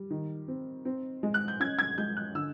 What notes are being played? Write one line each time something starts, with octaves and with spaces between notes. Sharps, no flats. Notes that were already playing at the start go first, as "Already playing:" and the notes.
Already playing: G3
D#3
C4
C4
G#3
F#6
G6
C#4 G#6
G#6
G#3 G6
F#6
D3 E6